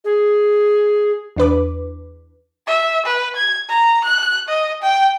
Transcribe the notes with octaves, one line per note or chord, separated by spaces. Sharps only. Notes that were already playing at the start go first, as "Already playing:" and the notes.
G#4
E2 D4 B4 D6
E5
B4
G#6
A#5
F#6
D#5
G5